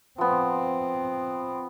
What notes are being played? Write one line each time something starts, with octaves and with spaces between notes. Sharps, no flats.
F3 B3 C4